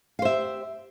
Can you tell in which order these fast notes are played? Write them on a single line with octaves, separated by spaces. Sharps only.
F5 C5 E5 G4